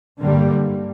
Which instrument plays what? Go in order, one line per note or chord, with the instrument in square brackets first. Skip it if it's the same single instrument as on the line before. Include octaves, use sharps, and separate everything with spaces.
[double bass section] G2 D3 G3 A#3